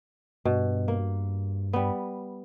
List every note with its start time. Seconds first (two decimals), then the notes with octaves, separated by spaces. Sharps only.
0.45 G2 B2
0.88 A#3
1.73 G3 B3